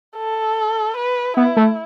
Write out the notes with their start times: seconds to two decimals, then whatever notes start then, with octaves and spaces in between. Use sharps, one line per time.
0.17 A4
0.97 B4
1.37 B3 E4
1.57 A3